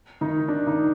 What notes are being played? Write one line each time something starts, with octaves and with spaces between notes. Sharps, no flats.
D#3 D#4
D4
D#3 D#4